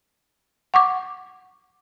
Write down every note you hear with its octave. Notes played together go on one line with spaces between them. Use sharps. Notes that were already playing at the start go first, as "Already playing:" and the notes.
F#5 C#6 D6